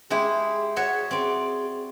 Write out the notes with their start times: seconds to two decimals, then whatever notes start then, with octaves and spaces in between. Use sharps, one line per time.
0.10 G#3 E4 G4 G#4
0.76 F#4 C#5 E5
1.11 C4 D5